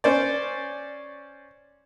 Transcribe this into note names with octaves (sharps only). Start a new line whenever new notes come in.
C#4 C5 D5